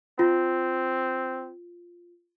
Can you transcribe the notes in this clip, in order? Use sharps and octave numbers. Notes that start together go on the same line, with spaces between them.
C4 F4